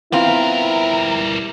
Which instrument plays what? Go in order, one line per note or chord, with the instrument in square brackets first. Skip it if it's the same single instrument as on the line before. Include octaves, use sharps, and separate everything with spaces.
[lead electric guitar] G3 A#4 [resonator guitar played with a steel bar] B3 C4 F4 [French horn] E4